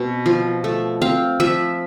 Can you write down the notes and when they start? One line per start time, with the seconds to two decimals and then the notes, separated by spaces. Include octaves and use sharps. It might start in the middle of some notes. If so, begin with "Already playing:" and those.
Already playing: B2 C4
0.26 F3
0.64 A3
1.02 C4 F5
1.40 F3 E5